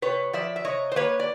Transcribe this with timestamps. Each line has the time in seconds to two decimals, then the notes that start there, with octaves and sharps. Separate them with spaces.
0.02 C3 B4 C#5
0.33 F3 D5 E5
0.56 E5
0.64 C3 C#5 D#5
0.92 C5
0.96 A#3 B4 C#5
1.20 D5